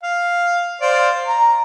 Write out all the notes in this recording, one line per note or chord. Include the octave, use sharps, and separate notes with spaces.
F5
C5 D5 F5
A#5